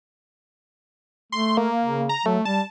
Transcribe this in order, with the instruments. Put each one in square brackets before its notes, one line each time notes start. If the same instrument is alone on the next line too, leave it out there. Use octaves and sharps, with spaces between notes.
[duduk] A3 [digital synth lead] C6
[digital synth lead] A#3
[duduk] C#3
[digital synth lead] A#5
[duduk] F#3 [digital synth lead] A3
[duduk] G3 [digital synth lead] A5